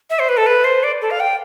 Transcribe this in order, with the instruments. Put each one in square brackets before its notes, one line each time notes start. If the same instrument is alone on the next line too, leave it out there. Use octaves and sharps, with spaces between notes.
[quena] E5
C5
B4
A4
B4
C5
D5
A4
F5
G5